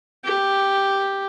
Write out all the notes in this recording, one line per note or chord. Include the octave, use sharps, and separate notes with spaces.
G4